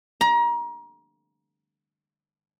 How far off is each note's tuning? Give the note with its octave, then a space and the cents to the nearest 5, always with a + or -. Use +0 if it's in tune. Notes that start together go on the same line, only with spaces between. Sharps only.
A#5 +30